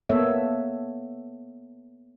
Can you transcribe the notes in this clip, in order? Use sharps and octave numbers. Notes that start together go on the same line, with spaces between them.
A#3 B3 A4 C#5 E5